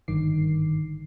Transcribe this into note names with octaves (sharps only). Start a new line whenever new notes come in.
G#1 G2 D3 D#3 D6 C7